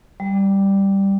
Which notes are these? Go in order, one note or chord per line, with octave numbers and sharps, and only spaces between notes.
G3